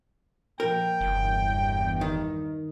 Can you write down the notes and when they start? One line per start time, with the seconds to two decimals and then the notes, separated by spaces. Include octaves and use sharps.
0.60 A#2 F3 A#4 G5
1.01 F#1 E2 G2
2.01 D#3